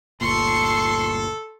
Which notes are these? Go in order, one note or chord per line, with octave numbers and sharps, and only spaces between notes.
G1 D2 A#2 A4 C6 C#6